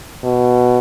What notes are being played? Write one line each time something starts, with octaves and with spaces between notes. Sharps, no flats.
B2